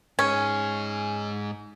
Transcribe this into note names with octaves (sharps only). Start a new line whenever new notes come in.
G#2 C#4 G#4